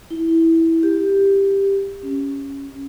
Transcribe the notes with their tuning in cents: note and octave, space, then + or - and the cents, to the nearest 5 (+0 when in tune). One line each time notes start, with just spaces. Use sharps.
E4 -10
G4 +5
C#4 +0